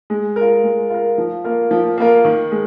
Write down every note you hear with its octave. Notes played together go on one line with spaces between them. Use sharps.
G#3
A#4
F4
G#3
F4 A#4
F3
A#3 F4 A#4
F3
A#3 F4 A#4
D#3
G#3